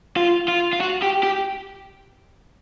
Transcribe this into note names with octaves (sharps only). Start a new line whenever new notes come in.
F4
F4
F4
F#4
G4
G4